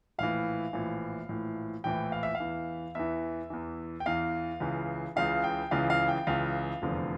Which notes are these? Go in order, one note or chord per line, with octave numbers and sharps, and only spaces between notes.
A#1 A2 E3 F5
A#1 A2 E3
A#1 A2 E3
A#1 A2 E3 G5
F5
E5
F5
E2 E3
E2 E3 E5
E2 E3
G5
E2 E3 F5
C#2 C#3 E3
C#2 C#3 E3 F5
G5
C#2 C#3 E3 F5
F5
G5
C#2 C#3 E3 F5
F1 E2 D3 F3